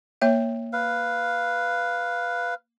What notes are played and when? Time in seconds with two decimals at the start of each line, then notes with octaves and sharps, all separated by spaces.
0.21 A#3 C#5 E5
0.73 B4 F5